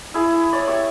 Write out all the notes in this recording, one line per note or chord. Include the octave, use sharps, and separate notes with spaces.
E4 G#4
C#5 D5
G4 E5 C#6